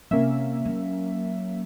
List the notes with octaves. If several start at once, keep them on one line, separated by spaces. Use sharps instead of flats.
C3 A#3 C#4 E5
F#3